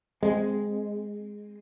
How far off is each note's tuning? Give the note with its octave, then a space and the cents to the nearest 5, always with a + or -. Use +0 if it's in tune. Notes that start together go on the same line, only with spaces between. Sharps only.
G#3 +0 C4 +0